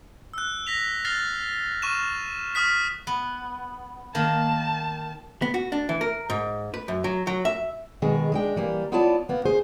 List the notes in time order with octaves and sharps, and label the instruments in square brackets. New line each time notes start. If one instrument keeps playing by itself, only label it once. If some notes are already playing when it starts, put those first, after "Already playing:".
[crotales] E6 F#6
A#6 B6 F7
F6 A6 C7 F7 G7
C#6 F6 D#7 E7
C#6 D#6 F6 B6
[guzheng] B3
[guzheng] D#3 [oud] A#3 [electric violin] A5
[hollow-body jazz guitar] B3
F#4
D4
E3
A#4
G#2
B4
F#2
F#3
F#3
E5
[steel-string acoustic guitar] B2 D#3 G#3 G#4
G#3 D4 G5
E3 G3 A#3
B3 E4 F4 C#5 D5 A5
A#3 B3
G#4 C5